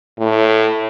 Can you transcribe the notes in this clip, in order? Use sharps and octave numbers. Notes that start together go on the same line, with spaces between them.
A2